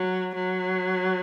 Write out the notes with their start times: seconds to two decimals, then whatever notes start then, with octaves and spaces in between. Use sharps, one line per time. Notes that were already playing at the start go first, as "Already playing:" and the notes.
Already playing: F#3
0.34 F#3